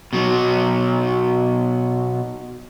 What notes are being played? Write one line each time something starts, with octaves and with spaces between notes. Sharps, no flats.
B2 F#3